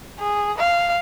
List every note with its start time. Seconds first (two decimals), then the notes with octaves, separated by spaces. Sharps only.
0.19 G#4
0.59 F5